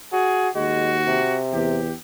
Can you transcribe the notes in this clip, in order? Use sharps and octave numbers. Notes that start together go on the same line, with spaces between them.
F#4 G#4
D#2 G#3 F#4
C3
E2 G4